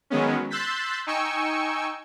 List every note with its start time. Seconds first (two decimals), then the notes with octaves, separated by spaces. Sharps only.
0.10 D#3 F#3 G#3 B3 C#4
0.50 C6 E6 F#6 G6 A6 B6
1.07 D#4 G5 G#5 C#6 E6 C#7